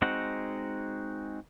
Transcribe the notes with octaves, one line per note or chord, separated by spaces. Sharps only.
G#3 C4 D#4 F#4 F#5